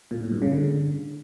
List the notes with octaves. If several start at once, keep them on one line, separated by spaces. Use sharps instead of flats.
A#2
A2
G2
C#3
D3